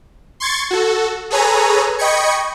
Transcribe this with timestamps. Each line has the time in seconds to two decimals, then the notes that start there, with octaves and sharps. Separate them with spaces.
0.40 C6 C#6 G#6 A6
0.71 F#4 A4
1.30 G#4 A4 B4 C#5 G#5 A#5
1.99 D#5 G5 B5 C#6 G#6 C#7